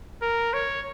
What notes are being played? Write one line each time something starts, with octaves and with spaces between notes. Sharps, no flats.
A#4
C#5